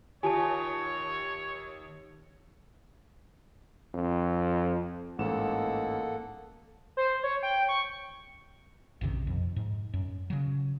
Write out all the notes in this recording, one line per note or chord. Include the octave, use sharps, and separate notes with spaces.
D#2 F4 G4 C#5 G#5 A5
F2
A1 G#2 A#3 A4 F#5 E7
C5
C#5
G5
C#6
A#1 F#2 C3 D#3
F2
G#2
F#2
C#3 F#3